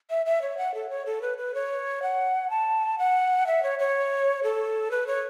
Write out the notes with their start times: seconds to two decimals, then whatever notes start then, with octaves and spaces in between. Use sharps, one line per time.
0.10 E5
0.26 E5
0.42 C#5
0.58 F#5
0.74 A4
0.90 C#5
1.06 A4
1.22 B4
1.38 B4
1.55 C#5
2.02 F#5
2.50 A5
2.98 F#5
3.47 E5
3.63 C#5
3.79 C#5
4.43 A4
4.91 B4
5.07 C#5